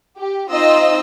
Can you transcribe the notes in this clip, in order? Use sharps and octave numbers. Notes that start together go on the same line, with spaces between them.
G4
C4 D#4 F4 D#5 E6